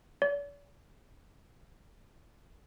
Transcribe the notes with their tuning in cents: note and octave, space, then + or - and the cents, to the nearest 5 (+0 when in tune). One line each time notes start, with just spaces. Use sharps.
D5 -45